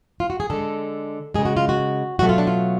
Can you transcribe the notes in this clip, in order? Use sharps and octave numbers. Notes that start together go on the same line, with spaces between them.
F4
F#4
G#4
D3 G#3 A4
C#3 G#3 G#4
F#4
F4
F#4
B2 F#3 A3 F#4
F4
D4
F4